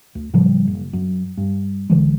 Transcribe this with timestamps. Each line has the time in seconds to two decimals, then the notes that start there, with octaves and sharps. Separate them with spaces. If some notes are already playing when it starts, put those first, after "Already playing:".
0.15 D2
0.34 A2 C#3 F3 G3
0.67 F#1
0.93 F#2
1.37 G2
1.90 B1 D3 E3 G#3